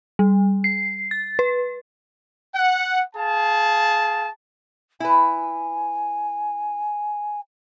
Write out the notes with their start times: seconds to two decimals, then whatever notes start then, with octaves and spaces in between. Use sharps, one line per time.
0.19 G3
0.64 C7
1.11 A6
1.39 B4
2.55 F#5
3.16 G#4 F5 A5
5.00 E4 B4 G#5